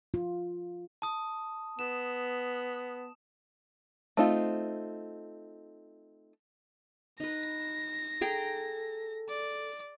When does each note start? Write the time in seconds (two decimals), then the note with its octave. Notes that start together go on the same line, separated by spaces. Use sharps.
0.14 F4
1.02 A5 D#6
1.79 B3 E7
4.17 A3 C4 D#4 F4
7.20 D#4 B4 A#6
8.21 G#4 A4 G5 A#5
9.29 D5